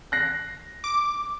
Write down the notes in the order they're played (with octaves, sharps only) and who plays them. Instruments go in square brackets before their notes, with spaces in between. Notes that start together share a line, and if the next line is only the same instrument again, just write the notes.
[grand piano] F#6 A#6 C7
[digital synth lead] D6